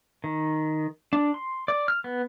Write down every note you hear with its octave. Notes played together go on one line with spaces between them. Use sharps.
D#3
D4
C6
D5
F6
B3